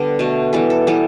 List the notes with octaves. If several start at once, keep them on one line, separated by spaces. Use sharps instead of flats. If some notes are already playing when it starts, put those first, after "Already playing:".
Already playing: D3 G3 B3 B4
B2 A3
E3 G3 B3 A4
A4
E3 G3 B3 A4